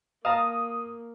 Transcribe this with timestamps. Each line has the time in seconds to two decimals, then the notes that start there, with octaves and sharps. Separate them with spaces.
0.25 A#3 F5 A5 A#5 D#6